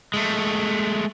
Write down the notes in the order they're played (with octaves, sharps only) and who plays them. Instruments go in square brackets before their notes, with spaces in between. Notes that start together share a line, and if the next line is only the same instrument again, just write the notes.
[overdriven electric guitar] G#3 A3